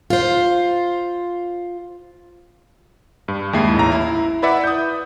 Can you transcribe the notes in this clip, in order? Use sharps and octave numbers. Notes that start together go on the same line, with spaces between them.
F4 C5
G2
D#2 G#3 E4 C7
A1 A#5
E4
E4 B4 D5 E5 F#5
D#6 G6